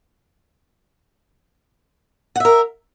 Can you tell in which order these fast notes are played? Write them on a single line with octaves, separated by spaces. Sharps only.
F#5 E5 A#4